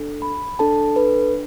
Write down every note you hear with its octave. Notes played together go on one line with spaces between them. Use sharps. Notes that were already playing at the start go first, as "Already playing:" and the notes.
Already playing: D4 A4
B5
D4 A4 A5
B4